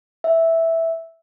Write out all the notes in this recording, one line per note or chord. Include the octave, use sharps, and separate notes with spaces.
E5